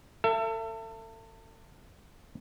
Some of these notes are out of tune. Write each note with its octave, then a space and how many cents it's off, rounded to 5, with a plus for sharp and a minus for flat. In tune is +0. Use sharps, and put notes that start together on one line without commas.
A4 +35 E5 +30